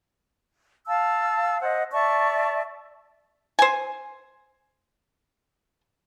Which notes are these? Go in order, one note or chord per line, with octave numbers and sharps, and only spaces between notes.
F5 A5 E6
C5 D#5 F#5
D5 E5 A5 C#6
C5 G#5